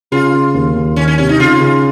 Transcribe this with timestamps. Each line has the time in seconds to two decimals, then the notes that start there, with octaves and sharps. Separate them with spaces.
0.12 C#3 F4
0.33 C#3
0.54 D#2
0.76 D#2
0.96 D#3 C#4
1.08 C#4
1.18 C3 C#4
1.29 D#4
1.40 C#3 F4
1.60 C#3